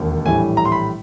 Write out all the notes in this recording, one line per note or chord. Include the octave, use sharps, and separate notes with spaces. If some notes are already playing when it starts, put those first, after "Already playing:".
Already playing: E1 D#2 D#3 A#3
A#1 A2 E3 G3 G#5
A#5
C6
B5